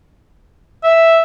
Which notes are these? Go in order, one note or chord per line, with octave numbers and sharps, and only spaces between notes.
E5